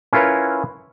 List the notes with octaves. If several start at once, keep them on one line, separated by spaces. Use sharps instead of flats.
C#4 E4 F4 A#4 B4 C#5